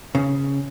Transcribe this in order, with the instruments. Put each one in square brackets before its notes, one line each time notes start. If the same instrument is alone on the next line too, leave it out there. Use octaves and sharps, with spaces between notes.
[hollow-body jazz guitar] C#3